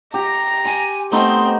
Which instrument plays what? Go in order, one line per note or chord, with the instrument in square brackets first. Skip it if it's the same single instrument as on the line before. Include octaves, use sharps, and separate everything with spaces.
[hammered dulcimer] G4 [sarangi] A#5
[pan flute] G#5 [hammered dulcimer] C6
[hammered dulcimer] A3 B3 D#4 [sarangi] C4 [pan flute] C6